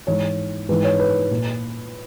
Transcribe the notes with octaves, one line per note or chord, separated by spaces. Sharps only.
G#2 E3 C#5
G#2 E3 B4
C#5
B4
A#2